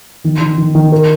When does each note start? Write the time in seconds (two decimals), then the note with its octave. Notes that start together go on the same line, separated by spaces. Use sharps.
0.24 D#3
0.41 D#3
0.58 D#3
0.75 D#3
0.92 A#4